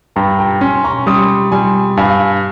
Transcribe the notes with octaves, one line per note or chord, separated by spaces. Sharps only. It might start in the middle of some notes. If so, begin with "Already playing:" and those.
G2 G5 A#5
G5 A#5
C#4 G#5 C6
A#5 C#6
G3 C6 D#6
G3 G#5 C6
G2 F5 G#5